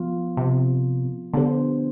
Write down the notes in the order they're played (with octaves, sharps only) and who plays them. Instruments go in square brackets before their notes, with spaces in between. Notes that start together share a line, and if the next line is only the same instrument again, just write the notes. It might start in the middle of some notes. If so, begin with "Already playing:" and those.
Already playing: [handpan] F3 B3 F4
[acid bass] C3
[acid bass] D3 [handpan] B3 D4 G4 C5